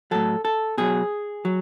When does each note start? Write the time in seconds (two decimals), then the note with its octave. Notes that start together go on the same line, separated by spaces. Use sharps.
0.11 A2 F#3 A4
0.45 A4
0.78 B2 F#3 G#4
1.45 F#3